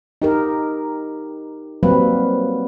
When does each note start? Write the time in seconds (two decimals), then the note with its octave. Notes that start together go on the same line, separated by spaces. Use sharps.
0.22 D#4 G4 A#4
1.83 F#3 G3 A#3 C4 B4